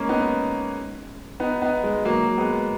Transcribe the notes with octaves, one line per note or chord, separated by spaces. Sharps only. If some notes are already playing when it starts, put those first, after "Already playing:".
Already playing: G#3 A#3 C#4
B3 D#4
B3 D#4
B3 D#4
G#3
F#3 A#3
G#3 B3